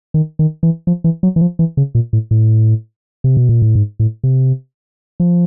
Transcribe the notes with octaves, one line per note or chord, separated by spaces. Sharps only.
D#3
D#3
E3
F3
E3
F#3
E3
F3
E3
C#3
A#2
A2
A2
C3
B2
A#2
A2
G#2
A2
C3
F3